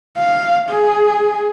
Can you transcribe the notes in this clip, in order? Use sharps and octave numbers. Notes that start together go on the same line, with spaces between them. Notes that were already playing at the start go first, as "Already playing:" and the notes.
F5
G#4